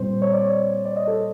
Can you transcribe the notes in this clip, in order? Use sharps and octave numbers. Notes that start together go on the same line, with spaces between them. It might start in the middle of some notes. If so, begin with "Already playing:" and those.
Already playing: A#2 G3 C4 C5
C#5
D5
C#5
D5
D#5
A4